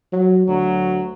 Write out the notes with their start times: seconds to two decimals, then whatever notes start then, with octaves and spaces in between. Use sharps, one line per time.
0.12 F#3
0.48 D2 F#3